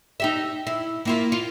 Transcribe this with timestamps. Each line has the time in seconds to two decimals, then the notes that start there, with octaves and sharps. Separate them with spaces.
0.20 D#4 G4 E5
0.67 E4
1.05 A#3 E4 F4
1.32 F4